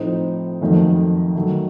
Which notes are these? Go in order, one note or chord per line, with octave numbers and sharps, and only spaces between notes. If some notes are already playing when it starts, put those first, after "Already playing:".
Already playing: A2 F3 C4 D#4
F2 D#3 F#3 A3
D#3 F#3 A3